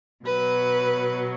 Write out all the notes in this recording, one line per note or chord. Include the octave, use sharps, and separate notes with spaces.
B2 F#3 B4